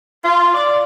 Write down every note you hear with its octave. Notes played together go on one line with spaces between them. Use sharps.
F4
D5